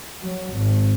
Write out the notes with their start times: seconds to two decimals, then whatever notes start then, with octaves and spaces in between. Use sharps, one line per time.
0.22 F#3
0.53 G#1